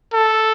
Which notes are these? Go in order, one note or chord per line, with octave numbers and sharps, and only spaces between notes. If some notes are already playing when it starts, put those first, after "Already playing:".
A4